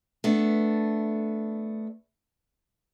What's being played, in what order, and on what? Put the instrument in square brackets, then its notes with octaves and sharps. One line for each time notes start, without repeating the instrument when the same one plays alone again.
[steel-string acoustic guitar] A3 B3 D4